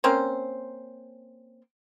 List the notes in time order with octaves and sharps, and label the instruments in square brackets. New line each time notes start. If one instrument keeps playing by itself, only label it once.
[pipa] A#3 C4 C#4 C5